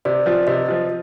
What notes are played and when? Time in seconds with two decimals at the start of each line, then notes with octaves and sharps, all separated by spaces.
0.05 C3 D5
0.26 F3 C4 F4
0.47 C3 D#5
0.68 F3 C4 F4